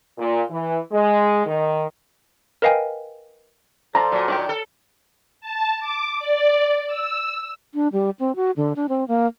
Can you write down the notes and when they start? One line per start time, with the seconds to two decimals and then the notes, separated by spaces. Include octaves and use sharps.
0.18 A#2
0.50 E3
0.92 G#3
1.46 D#3
2.62 A#4 B4 D#5 F5 G5 G#5
3.95 F3 F4 A4 C5 D5 A#5
4.12 A#2 F#3
4.28 D#3 D4 G4
4.49 A4
5.41 A5
5.79 D6
6.20 D5
6.87 E6
7.74 D4
7.93 G3
8.19 C4
8.36 F#4
8.57 D3
8.76 D4
8.89 C4
9.08 A#3